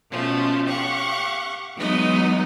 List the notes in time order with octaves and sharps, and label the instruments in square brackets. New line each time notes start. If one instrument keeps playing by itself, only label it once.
[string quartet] B2 F3 A3 C#4 F4
G4 F5 F#5 C#6
E3 F#3 G#3 B3 D#4 D#5